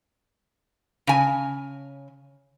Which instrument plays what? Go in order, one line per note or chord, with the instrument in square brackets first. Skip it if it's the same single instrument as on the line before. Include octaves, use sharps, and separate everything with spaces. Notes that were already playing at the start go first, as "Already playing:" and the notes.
[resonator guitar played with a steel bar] C#3 G#5